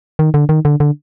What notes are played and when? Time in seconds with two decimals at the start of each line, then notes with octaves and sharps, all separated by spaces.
0.19 D#3
0.34 D3
0.49 D#3
0.65 D3
0.80 D3